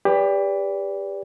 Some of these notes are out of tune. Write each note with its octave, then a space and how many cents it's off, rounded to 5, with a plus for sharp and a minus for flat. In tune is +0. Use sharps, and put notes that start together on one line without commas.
G4 +25 B4 +0 D5 -25